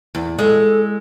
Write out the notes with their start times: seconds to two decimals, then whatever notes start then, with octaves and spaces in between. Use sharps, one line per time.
0.15 E2
0.39 G#3 A4